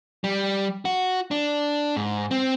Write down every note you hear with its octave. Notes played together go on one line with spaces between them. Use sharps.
G3
F#4
D4
G#2
C4